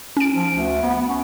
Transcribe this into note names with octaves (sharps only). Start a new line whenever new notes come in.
C#4 D7
F3
D2
B3
C#4